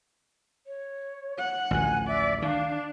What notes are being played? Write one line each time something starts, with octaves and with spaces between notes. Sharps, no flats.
C#5
F#5
A1 D2 F3 G#5
D5 E5
D#3 D4 F5